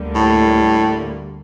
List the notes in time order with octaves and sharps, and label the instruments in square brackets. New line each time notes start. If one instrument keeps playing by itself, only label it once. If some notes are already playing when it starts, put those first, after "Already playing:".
Already playing: [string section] D2 D3 G3 A#3
[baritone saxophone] A2